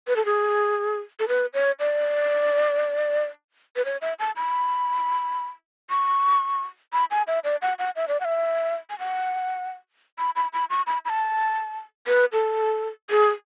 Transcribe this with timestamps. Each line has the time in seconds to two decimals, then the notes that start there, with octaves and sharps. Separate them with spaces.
0.07 B4
0.16 A4
0.25 G#4
1.20 A4
1.28 B4
1.54 C#5
1.80 D5
3.76 B4
3.85 C#5
4.02 E5
4.19 A5
4.36 B5
5.90 C#6
6.93 B5
7.11 G#5
7.27 E5
7.44 D5
7.62 F#5
7.79 F#5
7.96 E5
8.08 D5
8.20 F#5
8.25 E5
8.90 G#5
8.99 F#5
10.19 B5
10.36 B5
10.53 B5
10.70 C#6
10.87 B5
11.05 B5
11.09 A5
12.07 B4
12.33 A4
13.10 G#4